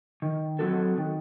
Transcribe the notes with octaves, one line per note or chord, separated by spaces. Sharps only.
D#3
F#3 C4 F#4 A4
D#3